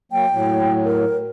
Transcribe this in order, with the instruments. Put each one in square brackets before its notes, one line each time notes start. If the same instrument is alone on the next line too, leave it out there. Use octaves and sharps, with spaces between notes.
[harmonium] F#3 A#3 [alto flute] G5
[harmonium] A2 F#3
[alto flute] A#4